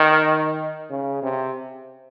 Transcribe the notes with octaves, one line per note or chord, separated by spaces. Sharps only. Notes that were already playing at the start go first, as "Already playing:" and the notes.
Already playing: D#3
C#3
C3